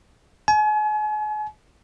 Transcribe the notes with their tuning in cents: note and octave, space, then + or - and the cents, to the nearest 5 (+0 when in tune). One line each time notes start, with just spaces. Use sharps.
G#5 +40